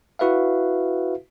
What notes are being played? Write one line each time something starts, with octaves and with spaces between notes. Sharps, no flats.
E4 F#4 B4 E5 F5